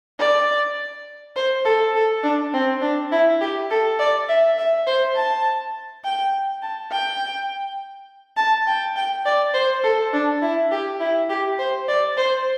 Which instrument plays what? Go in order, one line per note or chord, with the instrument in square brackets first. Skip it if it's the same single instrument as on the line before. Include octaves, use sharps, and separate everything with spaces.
[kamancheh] D5
C5
A4
A4
D4
C4
D4
E4
G4
A4
D5
E5
E5
C5
A5
G5
A5
G5
A5
G5
G5
D5
C5
A4
D4
E4
G4
E4
G4
C5
D5
C5